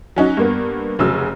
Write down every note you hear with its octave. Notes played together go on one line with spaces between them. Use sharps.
F#3 C#4 D#4 F#4
G2 A#3 B3
F1 C#3 F#3 E6